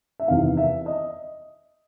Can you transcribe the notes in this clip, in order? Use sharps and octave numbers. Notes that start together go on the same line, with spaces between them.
E5
E2 C3 D#3 F5
E5
D#5